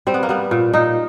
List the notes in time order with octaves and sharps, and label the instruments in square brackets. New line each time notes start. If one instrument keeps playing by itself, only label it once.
[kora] G3 C4
B3
A#3
G3 B3
A#2
A#2 D#4